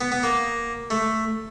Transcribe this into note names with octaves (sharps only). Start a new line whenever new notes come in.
B3
B3
A#3
A3